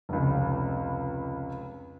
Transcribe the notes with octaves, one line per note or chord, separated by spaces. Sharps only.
F1 C#2